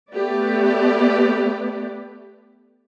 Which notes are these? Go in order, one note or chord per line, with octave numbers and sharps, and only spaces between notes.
A3 B3 G4 B4 D5